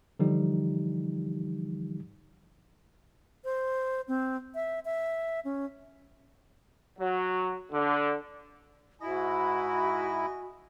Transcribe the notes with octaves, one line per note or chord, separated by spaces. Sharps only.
D3 E3 F3 G3 D#4 G4
C5
C4
E5
E5
C#4
F#3
D3
G#2 E4 F#4 D#5 E5 G#5